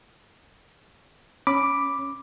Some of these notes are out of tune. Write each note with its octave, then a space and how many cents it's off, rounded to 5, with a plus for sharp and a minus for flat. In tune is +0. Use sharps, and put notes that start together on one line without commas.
C#4 +0 B5 +0 D6 +0